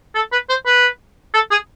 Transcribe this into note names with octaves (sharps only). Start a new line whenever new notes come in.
A4
B4
C5
B4
A4
G#4